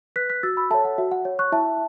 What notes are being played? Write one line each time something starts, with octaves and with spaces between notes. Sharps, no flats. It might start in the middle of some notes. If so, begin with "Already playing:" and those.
B4 F#6 B6
F#6 B6
F#4 E6 A6
B5 E6
A4 C#5 E5 A5
F#5
F#4 E5
F#5
C#5
C#6 F#6
E4 E5 A5